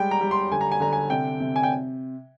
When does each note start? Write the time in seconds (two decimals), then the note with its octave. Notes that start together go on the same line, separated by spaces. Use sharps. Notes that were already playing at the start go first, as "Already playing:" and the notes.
Already playing: G3 G#3 G5
0.11 A#5
0.21 G3
0.31 C6
0.51 D3 G#5
0.61 A#5
0.72 G#5
0.80 D3 A#5
0.93 G#5
1.10 C3 G5
1.40 C3
1.56 G#5
1.63 G5